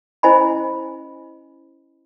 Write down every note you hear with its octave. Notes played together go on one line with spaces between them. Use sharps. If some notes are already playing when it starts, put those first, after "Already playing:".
C#4 E4 C5 D#5 G#5 B5